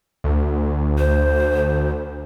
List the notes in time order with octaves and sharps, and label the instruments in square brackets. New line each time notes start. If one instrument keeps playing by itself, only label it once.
[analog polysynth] D2
[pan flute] C5